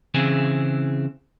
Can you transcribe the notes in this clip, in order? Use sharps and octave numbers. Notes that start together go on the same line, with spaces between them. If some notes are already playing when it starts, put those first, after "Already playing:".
C#3 E3 C4 E4 G#4